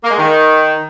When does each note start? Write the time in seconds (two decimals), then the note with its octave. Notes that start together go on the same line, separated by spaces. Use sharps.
0.03 A#3
0.10 G#3
0.18 D#3